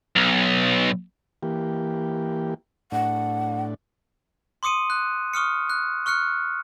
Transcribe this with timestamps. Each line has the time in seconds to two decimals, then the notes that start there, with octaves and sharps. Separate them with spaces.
0.16 B1
1.43 E3 A#3 G4
2.92 A2 D4 F#5
4.63 C6 D6 D#6 C#7 D#7
4.90 F#6
5.33 C#6 D#6 F6 C#7
5.70 F#6
6.06 C#6 F6 F#6 C#7